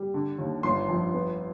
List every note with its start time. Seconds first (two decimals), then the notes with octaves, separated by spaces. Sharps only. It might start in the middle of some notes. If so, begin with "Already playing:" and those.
Already playing: G3
0.14 D3
0.38 D#2
0.63 G1 C6
0.89 F2
1.14 B3